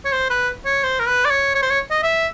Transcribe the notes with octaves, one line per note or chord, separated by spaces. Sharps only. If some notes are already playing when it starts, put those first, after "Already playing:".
C#5
C5
B4
C#5
C5
A#4
B4
D5
C#5
C#5
C5
C#5
D#5
E5